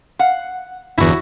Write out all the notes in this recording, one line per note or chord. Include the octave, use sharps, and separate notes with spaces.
F5 F#5
G1 E2 E4 F#4